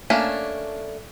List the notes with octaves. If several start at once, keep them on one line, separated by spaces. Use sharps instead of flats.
A3 A#3 C#4 D4